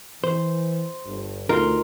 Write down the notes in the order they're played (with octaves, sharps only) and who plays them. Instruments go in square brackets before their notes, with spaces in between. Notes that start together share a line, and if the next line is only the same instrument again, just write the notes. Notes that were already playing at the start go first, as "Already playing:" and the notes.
[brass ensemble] E3 [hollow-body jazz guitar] C5
[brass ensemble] G1 G2
[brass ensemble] D2 B2 [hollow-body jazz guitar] D#4 A#4 [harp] F4